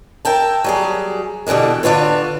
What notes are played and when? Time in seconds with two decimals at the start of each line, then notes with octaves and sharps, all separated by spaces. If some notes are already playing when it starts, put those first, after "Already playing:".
0.25 A#4 E5 G5 A5
0.64 F#3 G3 G#4
1.47 B2 D3 E3 G3 G#3
1.83 D3 D4 F4 B4 C#5